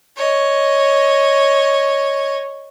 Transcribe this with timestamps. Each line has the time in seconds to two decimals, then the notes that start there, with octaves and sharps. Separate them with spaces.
0.17 C#5 D#5